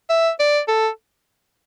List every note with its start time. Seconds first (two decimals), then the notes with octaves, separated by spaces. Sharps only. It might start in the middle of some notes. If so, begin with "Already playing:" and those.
0.09 E5
0.39 D5
0.68 A4